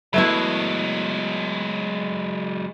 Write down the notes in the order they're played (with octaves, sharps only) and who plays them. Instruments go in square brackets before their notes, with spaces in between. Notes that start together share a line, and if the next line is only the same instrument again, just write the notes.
[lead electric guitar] F#3 G#3 [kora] A3 B3 E4